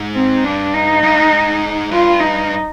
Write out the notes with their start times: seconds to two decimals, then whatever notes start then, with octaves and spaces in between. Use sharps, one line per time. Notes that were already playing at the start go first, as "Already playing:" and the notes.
Already playing: G#2
0.14 C4
0.44 G2 D4
0.74 D#4
1.03 G2
1.17 G#2
1.91 G2 F4
2.20 D#4